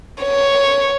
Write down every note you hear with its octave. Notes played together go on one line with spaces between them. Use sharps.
C#5